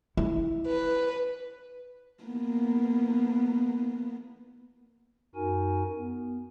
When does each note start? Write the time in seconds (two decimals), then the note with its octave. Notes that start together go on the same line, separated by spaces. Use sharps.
0.17 E4
0.67 B4
2.23 A#3 B3
5.35 F#2 D#4 F#4 A#4 G#5
5.96 B3